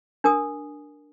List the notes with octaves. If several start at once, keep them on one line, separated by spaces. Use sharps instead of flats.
D4 A#4 G#5 D#6